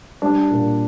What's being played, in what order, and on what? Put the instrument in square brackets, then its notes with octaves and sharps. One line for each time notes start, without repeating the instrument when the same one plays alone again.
[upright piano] G3 D4
A#2